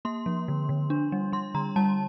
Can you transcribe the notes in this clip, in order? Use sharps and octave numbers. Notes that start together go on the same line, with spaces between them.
A#3 C6
F3
D3
D3
D4
G3
G3 C6
D3 A#5
G3 A5